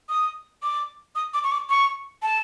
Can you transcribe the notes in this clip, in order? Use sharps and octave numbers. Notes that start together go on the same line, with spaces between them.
D#6
D6
D#6
D6
C#6
D6
C#6
A5